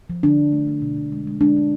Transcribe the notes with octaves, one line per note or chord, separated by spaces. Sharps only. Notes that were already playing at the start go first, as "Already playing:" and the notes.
F3
D3 D4
F3
A3
A3
B2
B2
G#3
G#3
G#3 D4
G#3